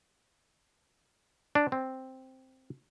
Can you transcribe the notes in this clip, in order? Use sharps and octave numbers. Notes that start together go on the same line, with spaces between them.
D4
C4